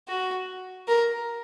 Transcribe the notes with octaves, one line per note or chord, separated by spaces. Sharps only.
F#4
A#4